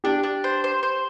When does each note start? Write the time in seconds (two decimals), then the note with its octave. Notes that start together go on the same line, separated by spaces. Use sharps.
0.04 D4 G4
0.23 D4
0.44 C5
0.64 C5
0.83 C5